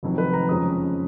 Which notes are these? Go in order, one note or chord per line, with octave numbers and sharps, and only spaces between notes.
F1 F2 D#3 F#3
B4
A#5
F#1 F2 F3 G#3 C#4 D#6